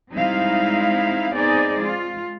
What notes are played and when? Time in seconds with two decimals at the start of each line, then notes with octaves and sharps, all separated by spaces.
0.12 G3 G#3 C4 D#4 E4 F5
1.34 B3 C4 D#4 G#4 D5
1.80 G#3 F4